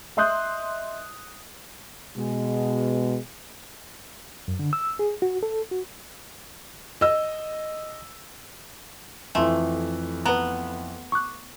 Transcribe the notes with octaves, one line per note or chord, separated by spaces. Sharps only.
D#5 E5 C6 D#6 F#6 G6
B2 G#3
F#2
D3
E6
G#4
F#4
A4
F#4
D#5 E6
F2 E3 A3 G#5 A5 C6
B3 B4 A5 A#5
C#6 D6 F#6